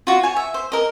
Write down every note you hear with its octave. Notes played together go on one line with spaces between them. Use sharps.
F4 F#4
C#5 G#5
E5
C5
A#4 D#5